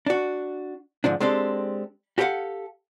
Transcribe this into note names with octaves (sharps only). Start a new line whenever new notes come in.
D4 F#4
G#2 D3 F3 D4
G#3 C4 D4 G4 A4
F#4 G4 A4 B4 F5 F#5